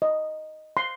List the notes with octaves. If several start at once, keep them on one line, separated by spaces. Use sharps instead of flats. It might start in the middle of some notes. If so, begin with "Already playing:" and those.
D#5
C6